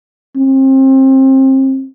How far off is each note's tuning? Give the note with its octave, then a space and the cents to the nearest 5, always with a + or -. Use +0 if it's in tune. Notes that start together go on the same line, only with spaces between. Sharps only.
C4 +30